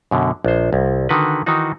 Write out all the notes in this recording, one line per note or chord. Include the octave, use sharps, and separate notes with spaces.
F#2 B2 D3
A#1 C5
C2
D3 D#3 F#4 B4
D#3 E3 D#4 F#4